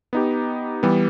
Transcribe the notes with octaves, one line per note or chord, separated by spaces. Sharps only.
B3 D#4 G4
E3 G3 B3